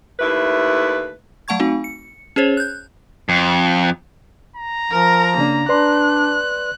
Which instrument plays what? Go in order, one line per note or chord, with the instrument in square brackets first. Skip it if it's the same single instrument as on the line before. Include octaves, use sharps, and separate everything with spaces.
[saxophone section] D#2 A3 E4 B4
[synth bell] F#3 A3 F#5 A5 C#6 G#6
A3 C4 D#4 F#4
C#7
C#4 G#4 C5 C#5
F#6 G6
[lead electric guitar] F2
[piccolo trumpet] A#5
[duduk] F3 [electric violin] A#4
[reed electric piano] C#3 D4 [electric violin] A#3
[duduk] D4 [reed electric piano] B4 D5 C6 [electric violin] F#6